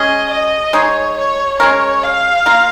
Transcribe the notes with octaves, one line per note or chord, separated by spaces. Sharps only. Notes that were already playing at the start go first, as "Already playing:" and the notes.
Already playing: G#3 C#4 G#4 D#5
D#5
G#3 D#4 G#4 C#5
C#5
G#3 C#4 A#4 C#5
F5
A#3 F4 A#4